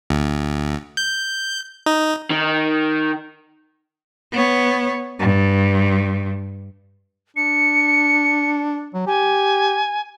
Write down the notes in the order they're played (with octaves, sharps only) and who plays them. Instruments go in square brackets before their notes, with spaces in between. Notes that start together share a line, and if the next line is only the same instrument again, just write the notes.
[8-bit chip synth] D2
G6
D#4
[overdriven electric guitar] D#3
[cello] B3 C#5
G2
[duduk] D4 [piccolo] C#7
[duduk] F#3
[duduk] G4 [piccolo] G#5